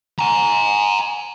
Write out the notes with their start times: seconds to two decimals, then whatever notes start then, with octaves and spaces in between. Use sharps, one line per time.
0.19 G#5 A#5